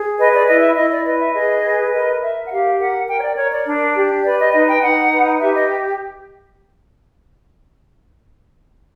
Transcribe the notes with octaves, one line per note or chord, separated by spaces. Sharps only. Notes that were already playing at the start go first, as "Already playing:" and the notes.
Already playing: G#4
B4 D#5
D5
E4 D#5
E5
E4 D#5
D5
B4 D#5
E5
G#4 D#5
B4
A#4 D#5
A#4 E5
F#5
G4 F5
A#4 F#5
A#4 G5
C#5
D5
A#4 C#5
D5
D4
G4
B4 D5
D#5
D#4 D#5
G5
D#4 F#5
B4
G4 E5
D#5